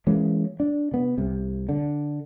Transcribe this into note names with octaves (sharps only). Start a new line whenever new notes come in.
E3 G#3 A#3 C#4
D4
C3 B3
C2 C3
D3